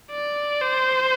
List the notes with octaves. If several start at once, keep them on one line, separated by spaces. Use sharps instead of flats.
D5
C5